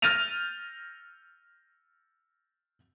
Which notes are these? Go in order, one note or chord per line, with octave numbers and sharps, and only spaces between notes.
F6 G6 A6 A#6 D#7 F7